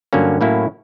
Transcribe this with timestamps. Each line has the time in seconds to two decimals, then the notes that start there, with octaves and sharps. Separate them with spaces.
0.13 G2 D3 F#3 A#3 C#4
0.41 A2 F#3 A#3 C#4 E4